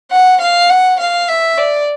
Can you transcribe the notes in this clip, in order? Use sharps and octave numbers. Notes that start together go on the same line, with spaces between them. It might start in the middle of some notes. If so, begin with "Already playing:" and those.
F#5
F5
F#5
F5
E5
D5